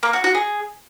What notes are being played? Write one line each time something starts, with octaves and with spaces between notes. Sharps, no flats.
A#3
F#4
F#4
G#4